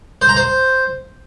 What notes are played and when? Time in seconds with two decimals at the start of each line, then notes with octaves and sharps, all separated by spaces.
0.22 C5
0.29 A#5
0.36 C5